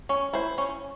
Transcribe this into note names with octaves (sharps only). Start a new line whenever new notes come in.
C#4
E4 C5
C#4